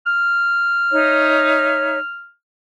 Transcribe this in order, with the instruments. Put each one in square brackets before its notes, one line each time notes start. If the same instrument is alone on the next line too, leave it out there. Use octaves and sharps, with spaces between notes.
[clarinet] F6
[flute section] D#4 C#5 E5